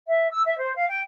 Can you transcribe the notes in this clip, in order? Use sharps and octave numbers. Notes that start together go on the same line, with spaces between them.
E5
E6
E5
C5
F5
G5